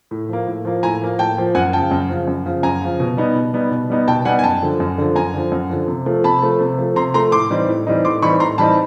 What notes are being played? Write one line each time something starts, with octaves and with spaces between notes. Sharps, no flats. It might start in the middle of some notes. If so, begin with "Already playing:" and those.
A2
F3 A#3
A2
F3 A#3
A2 G#5 A#5
F3 A#3
A2 G5 A5
F3 A#3
F#2 F#5 G#5
C#3 F3 G5 A5
F#2
C#3 F3
F#2
C#3 F3
F#2 G#5 A#5
C#3 F3
B2
G3 B3 D#4
B2
G3 B3 D#4
B2
G3 B3 D#4
B2 G5 A5
G3 B3 D#4 F#5 G#5
G#5
F#2 G5 A5
D3 F3
F#2
D3 F3
F#2 G#5 A#5
D3 F3
F#2
D3 F3
C3
F3 A3
C3 A5 B5
F3 A3
C3
F3 A3
C3 A#5 C6
F3 A3 A#5 C6
A2 C6 D6
E3 G3 C4 D#4
A2
E3 G3 C4 D#4
A2 C6 D6
E3 G3 C4 D#4 B5 C#6
A2 A#5 C6
E3 G3 C4 D#4 A5 B5